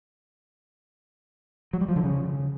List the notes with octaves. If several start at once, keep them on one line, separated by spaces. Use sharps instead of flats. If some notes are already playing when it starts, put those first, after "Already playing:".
F#3
G3
F3
D3
C#3